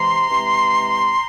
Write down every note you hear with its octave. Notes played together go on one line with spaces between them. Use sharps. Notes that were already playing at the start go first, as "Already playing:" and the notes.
Already playing: C3 E3 G#3 A#5 C6
C3 E3 G#3